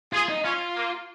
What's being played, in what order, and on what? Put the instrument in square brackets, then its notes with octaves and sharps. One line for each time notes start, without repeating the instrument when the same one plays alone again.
[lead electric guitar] F4 [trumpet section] G#4
[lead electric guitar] D#4
[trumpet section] C#4 [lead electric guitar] F4
[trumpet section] A#3